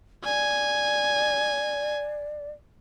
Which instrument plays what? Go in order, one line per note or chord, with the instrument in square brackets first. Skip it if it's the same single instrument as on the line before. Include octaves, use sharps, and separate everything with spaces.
[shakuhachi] D5 [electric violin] G#5